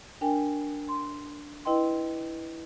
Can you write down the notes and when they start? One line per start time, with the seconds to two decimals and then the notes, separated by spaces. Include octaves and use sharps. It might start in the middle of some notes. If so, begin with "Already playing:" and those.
0.21 D4 A#4 G5 G#5
0.89 C6
1.65 E4 B4 D#5 G5 C6